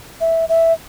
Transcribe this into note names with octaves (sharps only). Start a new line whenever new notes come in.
E5
E5